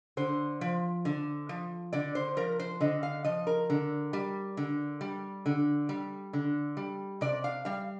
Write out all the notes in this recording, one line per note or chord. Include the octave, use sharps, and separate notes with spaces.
D3 C5
F3
D3
F3
D3 D5
C5
F3 A#4
C5
D3 D#5
F5
F3 D#5
A#4
D3
G3
D3
G3
D3
G3
D3
G3
C3 D5
F5
G3 F5